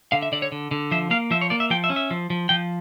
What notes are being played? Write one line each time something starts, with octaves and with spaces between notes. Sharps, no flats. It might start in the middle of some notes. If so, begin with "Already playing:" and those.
D3 F5
E5
D3 D5
C#5
D3
D3
F3 E5
A#3 F5
F3 E5
C#5
A#3 D5
E5
F3 G5
E5
C#4
E5
F3
F3
F3 G5